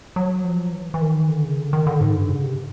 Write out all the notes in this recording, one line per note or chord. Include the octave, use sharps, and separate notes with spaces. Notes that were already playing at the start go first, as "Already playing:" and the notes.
F#3
F3
E3
E3
D#3
D3
C#3
D3
D#3
D3
G#2
G2
C#3
C3